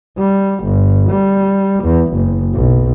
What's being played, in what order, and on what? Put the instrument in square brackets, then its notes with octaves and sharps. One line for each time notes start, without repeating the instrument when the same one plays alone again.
[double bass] G3
G1
G3
E2
F#1
B1